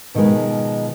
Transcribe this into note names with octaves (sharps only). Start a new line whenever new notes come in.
B2 D#3 F3 G#3 B4